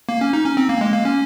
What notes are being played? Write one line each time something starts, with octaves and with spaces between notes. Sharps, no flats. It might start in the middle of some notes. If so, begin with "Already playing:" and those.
A#3
C#4
D#4
C#4
C4
A#3
G#3
A#3
C#4